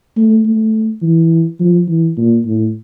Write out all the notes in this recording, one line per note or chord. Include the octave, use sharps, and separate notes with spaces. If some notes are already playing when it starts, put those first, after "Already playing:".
A3
A3
E3
F3
E3
A#2
A2